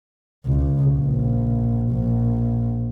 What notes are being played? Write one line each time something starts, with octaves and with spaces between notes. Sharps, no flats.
C#2
A#1
A#1